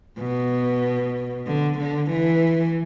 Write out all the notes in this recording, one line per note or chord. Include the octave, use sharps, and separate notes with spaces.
B2
D3
D3
E3